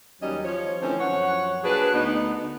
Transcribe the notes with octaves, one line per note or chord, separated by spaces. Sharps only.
D#2 F#3 G3 C#4 D#4 D#5
F3 C#5
D3 E3 F3 A3 C4 C#4
F#2 F3 C#5 F#5
A#2 D4 F#4 G#4 B4
D2 B3 D#4